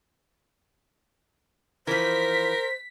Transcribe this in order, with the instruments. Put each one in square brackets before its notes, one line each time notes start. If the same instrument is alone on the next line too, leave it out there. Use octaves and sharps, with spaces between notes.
[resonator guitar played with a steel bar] E3 F3 [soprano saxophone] A#4 [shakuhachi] C5 [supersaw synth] B6